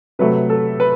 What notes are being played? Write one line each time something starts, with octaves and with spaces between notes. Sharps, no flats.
C3 F#3 A3 B4
A4
B4